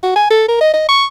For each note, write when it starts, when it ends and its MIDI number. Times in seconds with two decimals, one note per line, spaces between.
0.03 0.11 66
0.16 0.26 80
0.30 0.48 69
0.48 0.58 70
0.61 0.73 75
0.73 0.84 75
0.88 1.05 85